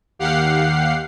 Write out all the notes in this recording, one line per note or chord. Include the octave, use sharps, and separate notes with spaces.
D#2 G4 F5 F#5 C7